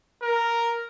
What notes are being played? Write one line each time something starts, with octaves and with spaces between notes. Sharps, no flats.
A#4